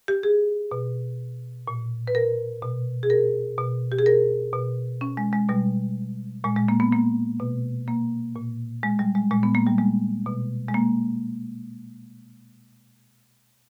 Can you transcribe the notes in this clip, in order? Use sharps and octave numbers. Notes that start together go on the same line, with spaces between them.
G4
G#4
B2
A#2
B4
A#4
B2
G#4
A#4
B2
G4
G#4
A#4
B2
C#4
G#3
G#3
B2 G3
A#2 G#3
G#3
A#3
B3
A#3
B2
A#3
A#2
G#3
G3
G#3
A#2 G#3
B3
A#3
G3
G#3
B2
G#3
A#3